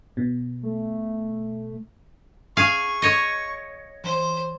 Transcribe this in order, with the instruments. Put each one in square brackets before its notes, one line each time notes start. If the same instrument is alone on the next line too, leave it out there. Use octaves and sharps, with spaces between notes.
[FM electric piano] B2
[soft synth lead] A3
[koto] G#4 F5 [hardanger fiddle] C#6
[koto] C#5 D#5
[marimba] E3 [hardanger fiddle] C5